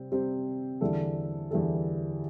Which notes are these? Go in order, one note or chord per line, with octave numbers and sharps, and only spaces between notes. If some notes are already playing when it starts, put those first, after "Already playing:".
Already playing: C3 G3 C4
C3 G3 C4 G4 C5
E2 D3 G3 E4 A4
E2 D3 G3 E4 A4